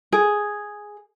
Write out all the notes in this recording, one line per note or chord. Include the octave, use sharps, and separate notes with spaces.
G#4